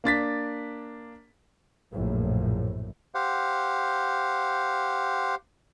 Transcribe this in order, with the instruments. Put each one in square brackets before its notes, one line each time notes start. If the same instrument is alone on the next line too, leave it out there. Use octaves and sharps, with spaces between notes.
[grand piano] A#3 D4 A6 B6
[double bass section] A#1 F#2 A2
[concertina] G4 C5 F5 F#5